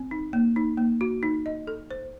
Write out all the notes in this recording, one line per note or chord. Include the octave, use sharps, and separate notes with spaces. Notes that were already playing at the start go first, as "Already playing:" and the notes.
Already playing: C4
D#4
A#3
D#4
A#3
F#4
D#4
D#5
A4
C5